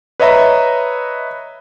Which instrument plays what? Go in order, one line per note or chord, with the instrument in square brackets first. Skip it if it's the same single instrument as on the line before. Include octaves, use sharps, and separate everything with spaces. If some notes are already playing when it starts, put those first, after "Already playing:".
[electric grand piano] B4 C#5 D#5 E5 A#5 B5